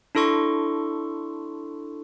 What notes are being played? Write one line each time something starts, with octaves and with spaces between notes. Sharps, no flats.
D4 E4 A4 C6 C#6